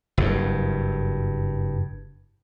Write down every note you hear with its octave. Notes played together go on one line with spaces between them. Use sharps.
F#1 G2